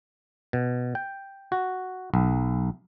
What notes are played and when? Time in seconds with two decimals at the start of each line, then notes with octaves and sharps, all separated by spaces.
0.53 B2
0.95 G5
1.52 F#4
2.14 B1